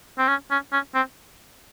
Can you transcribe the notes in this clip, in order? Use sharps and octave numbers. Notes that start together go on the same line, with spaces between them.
C4
C#4
C#4
C#4
C4